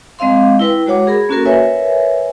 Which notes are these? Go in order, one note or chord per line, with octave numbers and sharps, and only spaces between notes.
G#3 C4 D#5 F5 C6
E4 B4 G5
G#3 F#4 C#5 F#5 D6
G#4 A#4 B5
A#3 C#4 F#4 A4 A#4
A#4 B4 C#5 E5 G#5